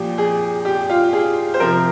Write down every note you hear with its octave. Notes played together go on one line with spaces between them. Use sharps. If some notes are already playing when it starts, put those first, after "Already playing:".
Already playing: A#2 F3 G4
G#4
G4
F4
G#4
C5
C3 F3 A#4